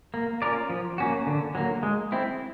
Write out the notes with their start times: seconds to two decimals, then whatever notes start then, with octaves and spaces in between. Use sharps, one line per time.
0.14 A#3
0.42 C#4 F4 A#4 D5
0.70 F3
0.98 A#3 C#4 F#4
1.27 D3
1.55 F#3 A#3
1.83 G#3
2.12 C4 E4